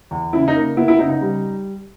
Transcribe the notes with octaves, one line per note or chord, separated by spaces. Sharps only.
E2
C#3 E4
D#4
A#3
B3 E4
E4
C#3 D#4
D#4
G3